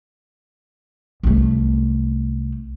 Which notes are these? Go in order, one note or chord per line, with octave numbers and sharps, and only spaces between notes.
C2 A3